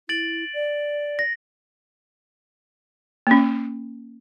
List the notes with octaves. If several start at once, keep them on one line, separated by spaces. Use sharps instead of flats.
E4 A6 D7 F#7
D5
A#6
A#3 C#4